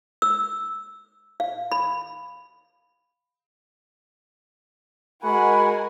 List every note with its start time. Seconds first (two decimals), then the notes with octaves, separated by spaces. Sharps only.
0.22 E6
1.40 F5
1.72 B5
5.23 G#3 F#4 A#4 F#5 G#5 B5